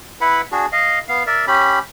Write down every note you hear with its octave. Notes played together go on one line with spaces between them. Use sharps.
E4 B4 F#5 B5
D4 F#4 G#4
D#5 F5
B3 F5
A#4 D5 E5
C#4 G4 B5